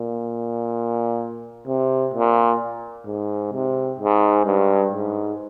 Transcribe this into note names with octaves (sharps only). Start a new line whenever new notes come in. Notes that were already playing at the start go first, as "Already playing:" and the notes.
Already playing: A#2
C3
A#2
G#2
C3
G#2
G2
G#2